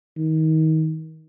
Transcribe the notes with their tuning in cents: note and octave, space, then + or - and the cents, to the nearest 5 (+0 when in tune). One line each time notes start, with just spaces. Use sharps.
D#3 +30